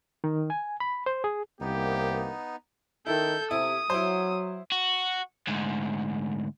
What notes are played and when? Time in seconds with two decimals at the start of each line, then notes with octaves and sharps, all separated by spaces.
0.24 D#3
0.50 G#5
0.80 B5
1.06 C5
1.24 G#4
1.61 C2 A#3 B3 D#4 G4
3.07 D#3 E4 A4 G6
3.51 C3 E4 D#6
3.90 F#3 E4 C5
4.72 F#4
5.47 D2 G#2